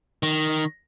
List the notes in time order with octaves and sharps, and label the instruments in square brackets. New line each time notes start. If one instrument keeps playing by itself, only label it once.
[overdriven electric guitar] D#3